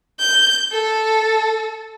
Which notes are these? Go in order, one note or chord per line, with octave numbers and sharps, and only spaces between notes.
G6
A4